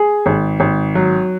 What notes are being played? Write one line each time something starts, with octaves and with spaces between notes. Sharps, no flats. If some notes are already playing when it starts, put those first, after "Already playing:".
Already playing: G#4
G#1
G#1
F#3